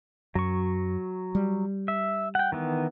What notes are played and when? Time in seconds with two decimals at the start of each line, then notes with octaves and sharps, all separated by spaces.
0.35 F#2 F#3 C#6
1.35 G3
1.88 E5
2.35 F#5 G5
2.52 D#3 E3 B3